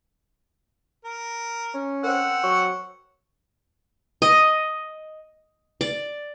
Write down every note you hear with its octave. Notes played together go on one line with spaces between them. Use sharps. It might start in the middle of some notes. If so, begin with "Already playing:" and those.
A#4
C#4
C4 A#4 C5 F#5 E6
F#3 C#6
D#5
D5